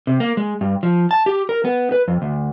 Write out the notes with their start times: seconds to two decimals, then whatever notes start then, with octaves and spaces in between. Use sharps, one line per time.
0.07 C3
0.20 A#3
0.37 G#3
0.61 G2
0.83 F3
1.11 A5
1.26 G4
1.49 A#4
1.65 B3
1.92 B4
2.08 F2
2.22 D2